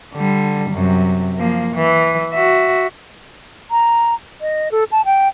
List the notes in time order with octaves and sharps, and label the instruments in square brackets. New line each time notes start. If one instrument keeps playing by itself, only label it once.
[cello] D3 G3
F#2 C3
F3 A#3
E3
F#4 E5
[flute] A#5
D#5
A4
A5
G5